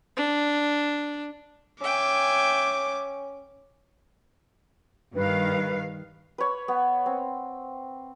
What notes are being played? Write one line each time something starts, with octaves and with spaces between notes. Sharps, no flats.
D4
C#4 E5 G5 G#5 D6
G2 D#3 B4 F5
B4 C#5
B3
C4